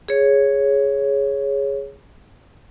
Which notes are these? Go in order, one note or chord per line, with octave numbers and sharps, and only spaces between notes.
G#4 C#5